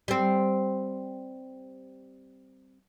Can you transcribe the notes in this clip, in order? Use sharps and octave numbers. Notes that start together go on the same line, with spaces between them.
G3 C4